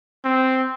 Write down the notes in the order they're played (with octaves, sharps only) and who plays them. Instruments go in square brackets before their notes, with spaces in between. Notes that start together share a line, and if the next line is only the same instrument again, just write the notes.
[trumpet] C4